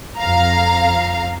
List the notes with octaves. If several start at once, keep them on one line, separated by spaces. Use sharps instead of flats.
F2 F5 A#5